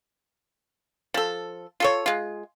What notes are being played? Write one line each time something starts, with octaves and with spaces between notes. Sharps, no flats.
F3 A4
F4 A4 C#5
G#3 F4